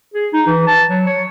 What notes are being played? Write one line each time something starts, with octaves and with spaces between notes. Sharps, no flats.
G#4
D#4
E3
A5
F#3
C#5